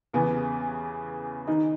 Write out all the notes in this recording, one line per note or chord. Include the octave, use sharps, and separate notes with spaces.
E2 C#3 E3 B3
D#3 D#4